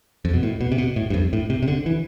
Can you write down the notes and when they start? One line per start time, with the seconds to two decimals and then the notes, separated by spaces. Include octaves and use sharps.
0.25 F2
0.33 B2
0.43 A2
0.61 B2
0.72 C3
0.78 B2
0.96 A2
1.10 G2
1.14 F2
1.33 A2
1.50 C3
1.62 C3
1.68 D3
1.86 E3